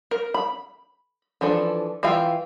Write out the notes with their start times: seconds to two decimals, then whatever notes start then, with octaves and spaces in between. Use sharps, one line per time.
0.11 A#4
0.34 B5
1.41 E3 F3 D4 A4
2.03 E3 F4 E5 F5 G5